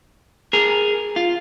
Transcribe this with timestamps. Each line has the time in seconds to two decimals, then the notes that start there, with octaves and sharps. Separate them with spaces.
0.53 G#4 A#4
1.16 F4